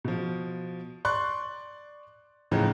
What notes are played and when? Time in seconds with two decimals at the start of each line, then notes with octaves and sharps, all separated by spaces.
0.04 B2 F3
1.05 D5 C6 C#6 F#6
2.51 A2 C#3 E3 F3 D#4